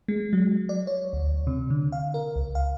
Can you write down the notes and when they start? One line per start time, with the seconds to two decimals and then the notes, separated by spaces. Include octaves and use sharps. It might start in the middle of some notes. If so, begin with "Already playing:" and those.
0.08 G#3
0.33 F#3
0.69 D5
0.87 C#5
1.13 D2
1.47 C3
1.70 D3
1.92 F5
2.14 A#4
2.36 C#2
2.55 F5